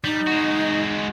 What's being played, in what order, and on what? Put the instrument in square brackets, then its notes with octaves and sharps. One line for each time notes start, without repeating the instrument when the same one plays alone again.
[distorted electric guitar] G3 [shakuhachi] D#4
[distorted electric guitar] G#3 F#4